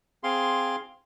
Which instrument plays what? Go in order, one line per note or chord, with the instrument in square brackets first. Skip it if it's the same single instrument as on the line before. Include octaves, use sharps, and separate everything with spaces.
[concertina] C4 G#4 F5 C6